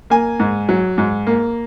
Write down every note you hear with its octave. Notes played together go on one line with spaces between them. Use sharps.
A#3 G#5
G#2
F#3
G#2
A#3